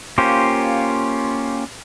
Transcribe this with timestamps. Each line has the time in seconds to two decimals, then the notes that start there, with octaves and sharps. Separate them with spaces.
0.18 A#3 C#4 F4 G4 C5